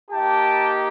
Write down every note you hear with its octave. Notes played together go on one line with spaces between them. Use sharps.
A#3 D#4 G4 G5 A5